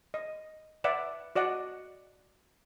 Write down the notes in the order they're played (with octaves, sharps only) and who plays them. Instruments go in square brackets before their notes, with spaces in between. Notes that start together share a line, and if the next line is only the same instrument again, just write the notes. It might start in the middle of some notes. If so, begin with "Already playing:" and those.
[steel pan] D#5
B4 D5 E5 F#5
F#4 D5 D#5 F#5